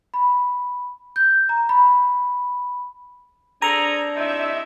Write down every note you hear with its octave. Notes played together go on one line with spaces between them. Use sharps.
B5
G6
A#5
B5
C4 D4 G#4 A4 A#5
C3 D#4 E4 E5